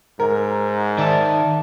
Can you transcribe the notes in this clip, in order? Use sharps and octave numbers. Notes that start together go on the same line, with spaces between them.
G#2 A#4
D#3 D5 E5 A5